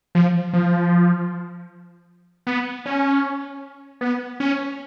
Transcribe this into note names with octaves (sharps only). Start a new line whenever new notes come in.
F3
F3
B3
C#4
B3
C#4